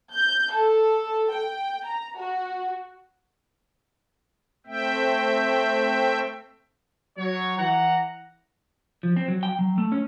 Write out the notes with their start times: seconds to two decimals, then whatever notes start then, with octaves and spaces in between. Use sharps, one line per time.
0.13 G6
0.52 A4
1.31 G5
1.85 A#5
2.18 F#4
4.66 A3 C4 E5 G5
7.17 F#3 C#5
7.57 E3 F#5 A#5
9.03 F3
9.16 C4
9.28 F#3
9.43 G5
9.59 F#3
9.78 A3
9.92 C#4